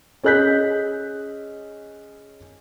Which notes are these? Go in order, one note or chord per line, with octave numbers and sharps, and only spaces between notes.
C#4 G#4 D#5 F#6 G6 B6